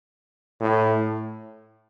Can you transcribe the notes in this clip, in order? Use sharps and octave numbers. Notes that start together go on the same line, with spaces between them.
A2